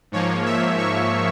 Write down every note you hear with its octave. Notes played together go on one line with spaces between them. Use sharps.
G#2 F3 A#3 C#5
E5
C#6